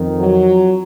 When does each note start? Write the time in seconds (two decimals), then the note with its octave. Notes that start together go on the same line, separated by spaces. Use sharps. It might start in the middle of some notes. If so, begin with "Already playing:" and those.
Already playing: F2 D#3
0.20 F#3